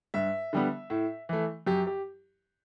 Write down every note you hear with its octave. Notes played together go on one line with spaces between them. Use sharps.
G2 E5
D3 G3 B3
A2
E3 A3
F#2 G4
G4